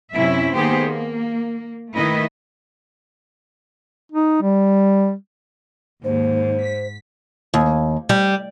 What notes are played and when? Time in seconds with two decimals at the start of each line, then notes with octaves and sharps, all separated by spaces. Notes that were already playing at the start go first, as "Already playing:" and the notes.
0.15 F#2 C3 C#4 E4 E5
0.54 D#3 A#3 B3 G4 G#4 C5
0.86 A#3
1.95 D#3 A3 E4 B4 D#5
4.12 D#4
4.42 G3
6.04 D#2 G#2 C5
6.63 B6
7.54 D#2
8.09 G3